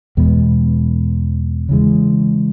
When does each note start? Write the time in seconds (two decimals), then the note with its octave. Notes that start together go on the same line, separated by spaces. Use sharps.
0.17 E2 B2 G#3 B3
1.69 C#3 E3 G#3